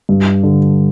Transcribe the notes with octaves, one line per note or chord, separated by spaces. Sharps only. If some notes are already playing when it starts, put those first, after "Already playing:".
G2
D3